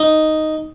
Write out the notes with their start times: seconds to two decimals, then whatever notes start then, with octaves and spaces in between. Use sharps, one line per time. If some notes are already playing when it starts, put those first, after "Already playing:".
Already playing: D#4